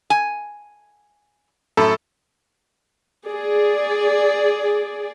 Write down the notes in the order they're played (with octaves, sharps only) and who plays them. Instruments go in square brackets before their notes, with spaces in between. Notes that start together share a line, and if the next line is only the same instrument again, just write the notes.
[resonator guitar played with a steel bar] G#5
[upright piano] F#2 A2 [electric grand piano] A4
[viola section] G#4 D5